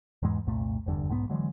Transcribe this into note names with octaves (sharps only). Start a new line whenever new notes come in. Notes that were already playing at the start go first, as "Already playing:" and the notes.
E2 G#2 E3 G#3
C2 F2 A#2 A3
F1 E2 G2 D3
B1 G#2 G3 B3
D3 E3 F#3 G#3